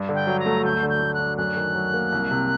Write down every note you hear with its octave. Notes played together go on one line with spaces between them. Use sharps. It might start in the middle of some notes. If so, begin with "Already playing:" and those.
Already playing: G2
D3
G5
F#3
A#5
A3
D2 G6
D3
G6
A3
F#6
D4
F#2 F#6
D#3
F#3
A#3
C2
C3